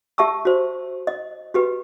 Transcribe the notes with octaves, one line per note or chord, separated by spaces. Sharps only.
G4 E5 A5 C#6 E6
F#4 C5
D#5
F#4 G4 B4